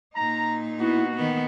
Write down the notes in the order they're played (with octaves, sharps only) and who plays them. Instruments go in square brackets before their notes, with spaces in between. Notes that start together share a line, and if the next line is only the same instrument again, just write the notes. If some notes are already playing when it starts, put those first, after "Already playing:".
[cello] A#2 D#4 [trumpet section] A#5
[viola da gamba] B3 [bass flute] E4 [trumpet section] F#4
[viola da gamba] D#3 B3 [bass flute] F#5